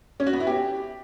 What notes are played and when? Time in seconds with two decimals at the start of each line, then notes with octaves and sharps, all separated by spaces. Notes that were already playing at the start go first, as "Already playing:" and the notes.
0.20 C#4
0.26 F#4
0.33 B3
0.40 E4
0.47 G4